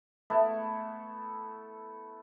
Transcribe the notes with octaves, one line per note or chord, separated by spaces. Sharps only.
A3 B3 E4 A4